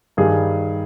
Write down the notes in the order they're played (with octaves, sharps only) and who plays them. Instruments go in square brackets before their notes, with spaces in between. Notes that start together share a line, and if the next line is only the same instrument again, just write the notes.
[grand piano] G2 D#3 G3 G#4